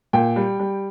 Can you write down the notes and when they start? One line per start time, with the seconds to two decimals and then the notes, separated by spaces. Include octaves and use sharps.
0.13 A#2 G5
0.36 G3
0.60 G3